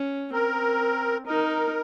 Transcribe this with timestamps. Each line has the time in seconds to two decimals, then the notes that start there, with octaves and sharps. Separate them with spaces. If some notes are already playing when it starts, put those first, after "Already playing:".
Already playing: C#4
0.33 C4 A#4
1.27 D#4 A#4